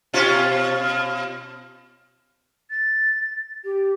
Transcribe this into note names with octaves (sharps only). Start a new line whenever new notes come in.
B2 C#4 F4
A6
G4